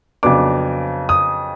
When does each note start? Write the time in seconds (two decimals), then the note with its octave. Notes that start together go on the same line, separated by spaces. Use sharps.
0.23 F2 C#3 F#3 B3 D4 D6
1.09 D#6